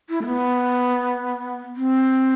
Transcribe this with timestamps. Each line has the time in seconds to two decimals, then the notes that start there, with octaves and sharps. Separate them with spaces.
0.10 E4
0.22 A3
0.26 B3
1.76 C4